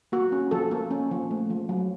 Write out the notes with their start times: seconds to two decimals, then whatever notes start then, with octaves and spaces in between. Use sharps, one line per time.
0.12 A#3 F#4
0.32 C#4
0.51 F3 A4
0.71 A#3
0.91 C#4
1.11 F3
1.31 A3
1.50 F3
1.69 F#3